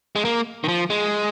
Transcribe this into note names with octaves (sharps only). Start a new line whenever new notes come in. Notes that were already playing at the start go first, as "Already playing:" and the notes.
G#3
A#3
D#3
F3
G#3